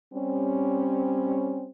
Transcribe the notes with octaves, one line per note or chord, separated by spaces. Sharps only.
G3 C4 C#4